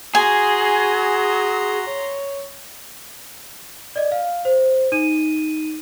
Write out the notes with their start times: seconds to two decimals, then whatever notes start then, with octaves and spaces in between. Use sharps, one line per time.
0.15 F#4 G#4 G#5 A#5 C6
1.87 C#5
3.96 D5 D#5
4.12 F5
4.45 C5
4.92 D#4 D#7